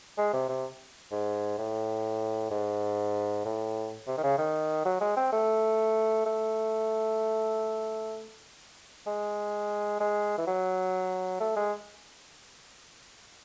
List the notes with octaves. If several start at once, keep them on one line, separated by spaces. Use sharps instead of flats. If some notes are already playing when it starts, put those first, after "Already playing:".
G#3
C3
C3
G#2
A2
G#2
A2
C3
D#3
C#3
D#3
F#3
G#3
C4
A3
A3
G#3
G#3
E3
F#3
A3
G#3